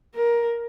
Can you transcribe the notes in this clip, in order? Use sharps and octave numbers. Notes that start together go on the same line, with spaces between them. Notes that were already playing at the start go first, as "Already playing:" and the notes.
A#4